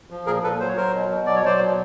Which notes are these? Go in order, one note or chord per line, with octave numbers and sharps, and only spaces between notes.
F3
A#2 G#4 A#4
A#2 A4 B4
F#3 C5
C#5
F#3 A#4 C5
B2
B2
F#3 D5
C#5
F#3 C5 D5
B2